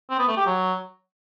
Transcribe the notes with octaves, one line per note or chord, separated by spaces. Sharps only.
C4
B3
A3
G4
F#3